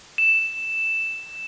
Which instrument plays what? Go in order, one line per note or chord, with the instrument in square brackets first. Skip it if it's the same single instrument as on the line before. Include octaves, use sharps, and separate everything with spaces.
[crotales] E7